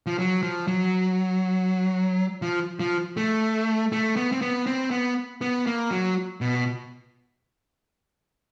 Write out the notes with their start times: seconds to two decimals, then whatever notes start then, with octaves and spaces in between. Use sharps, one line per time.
0.06 F3
0.19 F#3
0.43 F3
0.68 F#3
2.42 F3
2.80 F3
3.17 A3
3.92 A3
4.16 B3
4.32 C4
4.41 B3
4.66 C4
4.91 B3
5.41 B3
5.66 A#3
5.91 F#3
6.41 B2